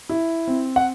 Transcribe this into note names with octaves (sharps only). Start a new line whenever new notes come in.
E4
C4
F#5